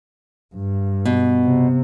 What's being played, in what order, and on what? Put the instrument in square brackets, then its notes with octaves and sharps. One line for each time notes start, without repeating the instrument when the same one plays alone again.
[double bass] G2
[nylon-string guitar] B2
[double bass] C3